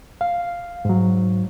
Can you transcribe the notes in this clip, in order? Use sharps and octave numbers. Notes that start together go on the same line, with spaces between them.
F5
G#2 F#3